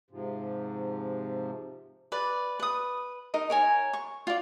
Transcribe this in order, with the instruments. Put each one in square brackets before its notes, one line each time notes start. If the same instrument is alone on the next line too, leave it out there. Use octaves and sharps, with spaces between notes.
[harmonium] G#2 C3 F3
[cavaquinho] B4 D5
B4 D#6
D#4 A#4 D#5
A#4 C#5 G#5
C#6
F4 D5